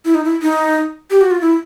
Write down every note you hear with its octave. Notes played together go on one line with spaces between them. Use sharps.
E4
D#4
E4
D#4
G4
F#4
F4
E4